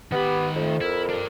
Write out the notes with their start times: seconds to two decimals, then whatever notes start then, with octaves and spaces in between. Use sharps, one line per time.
0.12 D#3 B3 G4 B5
0.56 F2 A3
0.81 E4 A#4
1.09 D4 G4